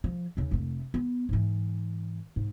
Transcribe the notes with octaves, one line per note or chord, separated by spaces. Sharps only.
F3
D#2 C#3
F1 A3
B3
G#2 E3
G#2